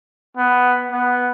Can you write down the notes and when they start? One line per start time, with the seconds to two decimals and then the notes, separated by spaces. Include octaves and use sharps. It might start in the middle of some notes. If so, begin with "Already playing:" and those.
0.37 B3
0.91 B3